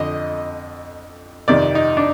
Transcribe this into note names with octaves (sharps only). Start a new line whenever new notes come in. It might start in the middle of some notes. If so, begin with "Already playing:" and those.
Already playing: F2 D3 D#5
F2 C3 D#3 D5
D#4
D4